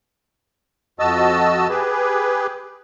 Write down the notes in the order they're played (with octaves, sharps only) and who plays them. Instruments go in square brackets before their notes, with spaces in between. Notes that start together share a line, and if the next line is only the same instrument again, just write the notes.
[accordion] F2 F#4 D#5 A5 E6
G4 G#4 B4